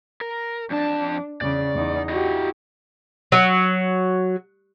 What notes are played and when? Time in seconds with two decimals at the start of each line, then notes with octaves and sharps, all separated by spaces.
0.21 A#4
0.70 F2 D4 A5
1.41 E2 C#3 D5
1.75 E2 D#4
2.09 E4 F#4 G4 D#5
3.32 F#3